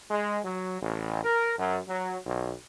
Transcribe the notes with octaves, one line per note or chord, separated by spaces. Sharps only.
G#3
F#3
A1
A#4
F#2
F#3
B1